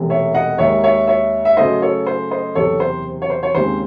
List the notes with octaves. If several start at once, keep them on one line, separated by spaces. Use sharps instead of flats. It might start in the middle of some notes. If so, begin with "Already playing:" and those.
Already playing: E1 E2 C3 E3 A3
C#5 E5
D#5 F#5
D#2 D#3 G#3 C#5 E5
C#5 E5
C#5 E5
E5
F#2 C#3 F#3 A3 C5 D#5
A4 C#5
C5
C5 D#5
F#1 E2 C3 A4 C#5
C5
C#5
C5
C#5
D#2 C#3 G#3 C4 C5